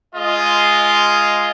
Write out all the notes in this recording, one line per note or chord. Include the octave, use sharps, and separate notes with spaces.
G#3 F4 G#4 D#5